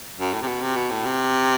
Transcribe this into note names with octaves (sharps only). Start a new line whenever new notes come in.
F#2
A2
C3
B2
C3
B2
A2
C3